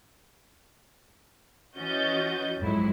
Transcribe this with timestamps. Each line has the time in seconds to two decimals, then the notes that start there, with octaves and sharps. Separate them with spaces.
1.76 E3 C#4 F#4 D#5 G6 A6
2.59 F2 G#2 F#3 E4